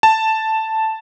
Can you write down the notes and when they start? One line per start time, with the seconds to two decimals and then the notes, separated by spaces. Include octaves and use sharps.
0.03 A5